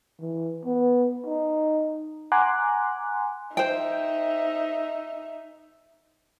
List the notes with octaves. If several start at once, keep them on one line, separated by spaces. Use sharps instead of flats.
E3
B3
D#4
F#5 G#5 A#5 C6 D6 F#6
D#4 C5 E5 G5